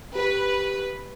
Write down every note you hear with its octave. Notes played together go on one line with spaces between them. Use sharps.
G4 B4